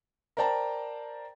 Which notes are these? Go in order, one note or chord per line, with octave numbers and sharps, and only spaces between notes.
A#4 C5 D5 G5 A5 A#5